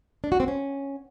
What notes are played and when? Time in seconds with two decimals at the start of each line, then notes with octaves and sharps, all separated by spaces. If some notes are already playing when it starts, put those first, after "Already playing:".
0.24 D4
0.32 F#4
0.40 C4
0.48 C#4